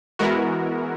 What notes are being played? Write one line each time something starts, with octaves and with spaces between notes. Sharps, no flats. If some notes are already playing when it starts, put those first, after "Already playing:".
E3 G#3 B3 E4 F#4 A#4